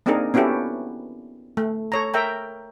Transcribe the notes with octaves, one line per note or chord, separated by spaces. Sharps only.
A#3 C4 D4 D#4 G#4 A#4
B3 C#4 E4 F#4 G4 A4
A3
A4 C#5 A#5
A#4 E5 G5 A#5